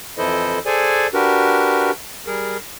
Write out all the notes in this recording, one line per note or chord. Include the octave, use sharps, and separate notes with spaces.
F2 E3 E4 A4 C5 D#5
G#4 A4 C5 D5 G#5
D4 F#4 G4 A#4 B4
G3 G#4 A#4